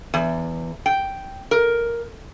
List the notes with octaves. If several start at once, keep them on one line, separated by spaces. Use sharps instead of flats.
E2
G5
A#4